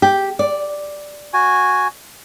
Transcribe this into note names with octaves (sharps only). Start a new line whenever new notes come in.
G4
D5
F#4 G#5